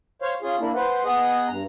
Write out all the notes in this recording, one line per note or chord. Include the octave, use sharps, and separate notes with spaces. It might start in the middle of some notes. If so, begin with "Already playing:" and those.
C5 C#5 F5
C#4 F4 G#4
A#3 D4 E4
B4 C5 F#5
B3 G#4 D#5 F#5
G2 A#5